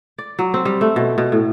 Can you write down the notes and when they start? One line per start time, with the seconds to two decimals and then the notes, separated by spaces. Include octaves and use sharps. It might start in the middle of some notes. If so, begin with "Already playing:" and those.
0.18 D5
0.39 F#3
0.54 C4
0.65 G3
0.81 A3
0.96 B2
1.18 B2
1.32 A2